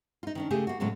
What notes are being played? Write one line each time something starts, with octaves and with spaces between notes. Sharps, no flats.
D#4 F4
D#3 C#4 D4
C#3 A3 G4 G#4
A#3 F#4
A2 C#3 F#3 G#3 C#4 F#4